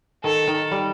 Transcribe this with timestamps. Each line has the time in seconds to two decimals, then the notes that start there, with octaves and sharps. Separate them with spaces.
0.24 D#3 A4
0.47 D#3
0.71 G3